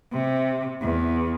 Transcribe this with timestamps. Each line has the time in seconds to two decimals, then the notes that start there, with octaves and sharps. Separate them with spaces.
0.13 C3
0.81 E2